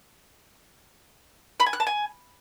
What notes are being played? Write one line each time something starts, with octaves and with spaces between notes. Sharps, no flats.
B5
G#5
F#6
A5
G#5